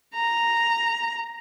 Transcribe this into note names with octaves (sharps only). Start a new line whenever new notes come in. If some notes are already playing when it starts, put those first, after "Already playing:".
A#5